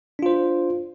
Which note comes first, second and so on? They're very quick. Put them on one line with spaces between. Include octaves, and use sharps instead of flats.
D4 F4 C5